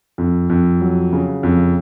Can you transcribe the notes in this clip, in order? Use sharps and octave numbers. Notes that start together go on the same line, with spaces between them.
F2
F2
F#3
C#3
F2